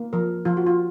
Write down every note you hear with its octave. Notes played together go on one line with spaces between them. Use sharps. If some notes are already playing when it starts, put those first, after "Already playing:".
Already playing: A#3
F3 A#4
F3 F4
F#4
F4